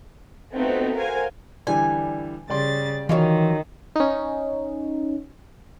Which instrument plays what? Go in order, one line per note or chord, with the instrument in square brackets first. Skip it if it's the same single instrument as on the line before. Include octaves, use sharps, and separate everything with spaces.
[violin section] A3 B3 C4 D#4 F4 F#4
F#4 A#4 C5 F5 G#5
[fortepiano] D3 E3 G3 [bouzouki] G#5
[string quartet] C#3 A6 [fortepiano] G3 D5 C6
[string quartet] D#3 [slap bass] E3 [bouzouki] F#3 D#4 F4
[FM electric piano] C#4 D#4